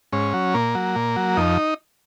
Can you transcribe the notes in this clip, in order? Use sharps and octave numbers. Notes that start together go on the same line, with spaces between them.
G#2 C#4
F#3
A#2 A#3
F#3
A#2
F#3
F2 D#4